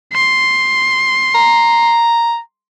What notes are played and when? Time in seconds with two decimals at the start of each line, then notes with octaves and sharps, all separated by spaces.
0.13 C6
1.35 A#5